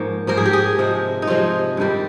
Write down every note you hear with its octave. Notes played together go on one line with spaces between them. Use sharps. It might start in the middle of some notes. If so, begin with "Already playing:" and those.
Already playing: G#2 F3 A#3 C#5
G#2 F3 A#3 A#4
G#4
G4
G#4
C3 F3 G#3
D#4
C3 F3 G#3 F4
G2 D#3 G3 A#3